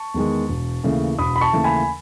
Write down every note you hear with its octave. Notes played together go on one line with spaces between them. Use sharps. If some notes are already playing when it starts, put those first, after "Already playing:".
Already playing: A5 C#6
E2 D#3 G#3
E1
D#2 C#3 E3 A3
E1 B5 D#6
B5
A5 C#6
D#2 C#3 E3 A3
G#5 B5